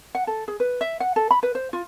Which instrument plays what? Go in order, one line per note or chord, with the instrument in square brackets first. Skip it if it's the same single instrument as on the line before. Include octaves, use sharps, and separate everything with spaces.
[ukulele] F#5
A4
G#4
B4
E5
F#5
A4
B5
B4
C5
F4